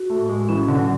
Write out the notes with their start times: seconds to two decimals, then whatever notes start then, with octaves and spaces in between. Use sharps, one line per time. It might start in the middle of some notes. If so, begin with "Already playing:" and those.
Already playing: F#4
0.10 A3
0.19 A2
0.29 G#3
0.49 E3 C#4
0.68 D3
0.79 F#3